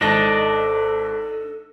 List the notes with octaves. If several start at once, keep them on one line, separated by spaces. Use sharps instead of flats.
G#1 D4 A4 D#5 A5 A#6